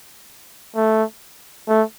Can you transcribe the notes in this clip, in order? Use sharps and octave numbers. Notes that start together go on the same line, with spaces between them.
A3
A3